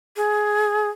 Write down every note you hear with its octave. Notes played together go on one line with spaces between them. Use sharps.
G#4